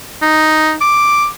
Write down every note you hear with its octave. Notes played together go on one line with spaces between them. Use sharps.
D#4
D6